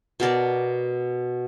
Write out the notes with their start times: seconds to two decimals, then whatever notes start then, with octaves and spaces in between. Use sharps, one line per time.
0.20 B2 A#4 D5 A5